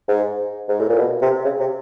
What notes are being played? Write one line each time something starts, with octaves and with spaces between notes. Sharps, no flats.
G#2
G#2
A2
A#2
B2
C3
C#3
C3